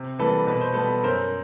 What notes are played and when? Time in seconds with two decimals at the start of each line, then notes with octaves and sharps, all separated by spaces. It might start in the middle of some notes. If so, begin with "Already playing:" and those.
Already playing: C3
0.19 E3 G3 A#3 A4 B4
0.47 B2 B4
0.61 C5
0.74 G3 B3 A4 B4
1.03 F#2 A#4 C5